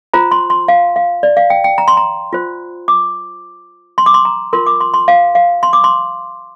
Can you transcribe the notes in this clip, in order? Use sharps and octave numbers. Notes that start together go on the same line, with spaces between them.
F4 C5 A#5
C6
C6
F5
F5
D5
F5
G5
G5
A#5
C6
A#5
F4 C5
D6
C6
D6
C6
A#5
F4 A#4 C6
D6
C6
C6
F5
F5
C6
D6
C6